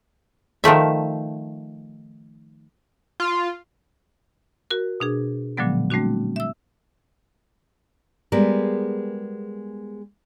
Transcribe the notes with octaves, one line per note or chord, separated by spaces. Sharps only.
D#3 F3 A3 E5
F4
F#4 A#4
B2 D4 G#4
A#2 D3 F3 F#3 G#3 B3
G3 A3 C4 D4 F#4
E5 E6
G3 G#3 B3 G#4 A#4